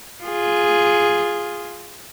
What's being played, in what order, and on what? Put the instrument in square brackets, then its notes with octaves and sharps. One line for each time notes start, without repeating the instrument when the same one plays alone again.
[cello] F4 G#4